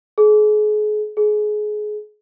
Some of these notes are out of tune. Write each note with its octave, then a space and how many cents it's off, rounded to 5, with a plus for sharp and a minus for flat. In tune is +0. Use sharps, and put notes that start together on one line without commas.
G#4 +35
G#4 +25